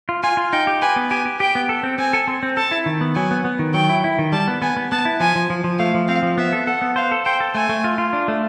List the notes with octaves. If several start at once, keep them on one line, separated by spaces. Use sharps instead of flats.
F4
F4 G#5
F4
D#4 G5
G4
B4 G#5
B3
G4 G#5
G4
G4 G5
B3
A4
C4
C4 G#5
A4
C4
C4
A4 A5
E4
D#3
B3
F#3 G#5
B3
B3
D#3
F#3 G5
E4
E4
D#3
G3 A5
B3
B3 G#5
B3
B3 A5
E4
F3 G#5
F3
F3
F3
A3 F5
F3
C4 F5
F3
B3 E5
A4
A4 F#5
B3
C5 F5
A4
C5 G5
A4
A3 G#5
A3
F4
F4
D4
A3